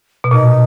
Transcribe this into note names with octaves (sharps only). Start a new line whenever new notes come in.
B2
A#2 D#4